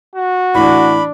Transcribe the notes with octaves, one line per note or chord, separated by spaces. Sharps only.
F#4
A2 E3 D4 B5